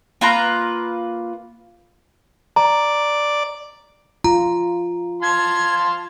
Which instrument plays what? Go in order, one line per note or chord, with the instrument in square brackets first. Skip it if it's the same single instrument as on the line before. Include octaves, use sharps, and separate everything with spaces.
[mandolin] A#3 F4 B4 A#5
[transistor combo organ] D5 [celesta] A#5
[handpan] F4 [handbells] A#5
[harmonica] F5 A5 C6 [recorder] G#6